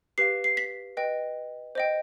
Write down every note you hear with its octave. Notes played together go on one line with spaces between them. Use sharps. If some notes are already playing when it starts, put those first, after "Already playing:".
G4 B4 F5 C7
C7
B6
B4 D#5 G5
C5 D#5 G5